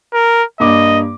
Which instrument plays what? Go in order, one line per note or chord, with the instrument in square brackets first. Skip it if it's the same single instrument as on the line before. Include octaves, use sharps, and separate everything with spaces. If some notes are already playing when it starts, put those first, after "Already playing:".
[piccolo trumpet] A#4
[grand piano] G2 A#3 D6 [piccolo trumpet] D#5